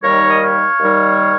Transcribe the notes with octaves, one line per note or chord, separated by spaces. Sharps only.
D#2 D#3 G3 A#4 C#5
D#5
C#5 F5
D#2 D#3 G3